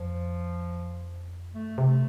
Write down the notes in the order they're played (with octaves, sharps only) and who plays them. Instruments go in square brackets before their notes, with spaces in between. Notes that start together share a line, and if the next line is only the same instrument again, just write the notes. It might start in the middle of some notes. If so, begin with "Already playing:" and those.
Already playing: [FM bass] F2 [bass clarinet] F3
[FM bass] G2 [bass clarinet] A3
[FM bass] C3
[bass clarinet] A3